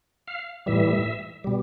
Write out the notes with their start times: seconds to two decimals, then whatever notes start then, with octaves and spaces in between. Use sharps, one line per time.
0.28 F5
0.66 A2 E3 G3 E5
1.44 B2 G3